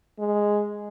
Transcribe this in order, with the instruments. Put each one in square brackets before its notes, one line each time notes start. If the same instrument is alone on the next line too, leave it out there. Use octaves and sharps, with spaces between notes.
[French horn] G#3